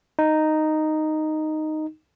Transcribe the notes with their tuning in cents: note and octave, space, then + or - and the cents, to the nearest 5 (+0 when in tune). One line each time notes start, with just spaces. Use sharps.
D#4 -5